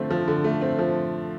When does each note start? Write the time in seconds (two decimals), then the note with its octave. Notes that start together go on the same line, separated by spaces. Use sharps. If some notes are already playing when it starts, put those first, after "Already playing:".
Already playing: D3 F3 A3 C4
0.11 F3
0.28 D3
0.44 A3
0.61 C4
0.79 F3